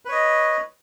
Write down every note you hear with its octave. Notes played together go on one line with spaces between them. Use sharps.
B4 C#5 D#5